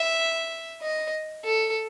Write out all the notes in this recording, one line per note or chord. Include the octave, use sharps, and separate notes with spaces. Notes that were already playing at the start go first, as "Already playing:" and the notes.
Already playing: E5
D#5
A4